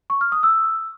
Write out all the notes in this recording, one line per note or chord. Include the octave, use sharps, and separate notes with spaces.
C#6
F6
D#6
E6